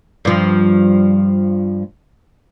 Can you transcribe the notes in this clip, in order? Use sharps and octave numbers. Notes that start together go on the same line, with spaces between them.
G2 F3